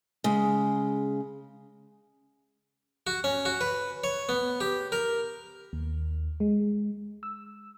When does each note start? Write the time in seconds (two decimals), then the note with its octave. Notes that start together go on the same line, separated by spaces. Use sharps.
0.24 C#3 G#3
3.07 F#4
3.24 C#4
3.45 F#4
3.61 B4
4.04 C#5
4.29 B3
4.60 G4
4.92 A#4
5.73 D#2
6.40 G#3
7.23 E6